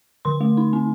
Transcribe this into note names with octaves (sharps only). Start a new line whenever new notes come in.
D3 C6
A3
D#4
C4